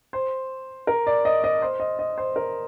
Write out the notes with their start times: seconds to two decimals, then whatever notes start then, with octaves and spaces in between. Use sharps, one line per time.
0.13 C5
0.87 A#4
1.07 D5
1.25 D#5
1.44 D#5
1.62 C5
1.80 D#5
1.99 D#5
2.18 C5
2.36 A#4